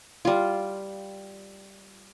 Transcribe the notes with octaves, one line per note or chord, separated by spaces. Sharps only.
G3 F4